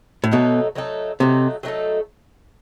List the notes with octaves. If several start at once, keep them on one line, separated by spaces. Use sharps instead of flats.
A2
B2 F#3 A3 D#4 A4
F#3 A3 D#4 A4
C3 F#3 A3 D#4 A4
F#3 A3 D#4 A4